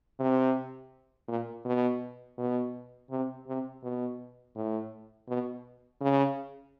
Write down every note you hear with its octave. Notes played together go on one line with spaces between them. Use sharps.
C3
A#2
B2
B2
C3
C3
B2
A2
B2
C#3